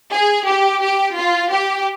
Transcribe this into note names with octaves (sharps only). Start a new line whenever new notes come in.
G#4
G4
G4
F4
G4